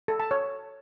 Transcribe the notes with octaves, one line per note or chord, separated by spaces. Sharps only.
A4
A5
C#5